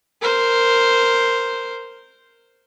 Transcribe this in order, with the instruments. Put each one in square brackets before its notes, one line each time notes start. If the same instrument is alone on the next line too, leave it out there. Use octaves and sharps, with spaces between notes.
[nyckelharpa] A#4 C5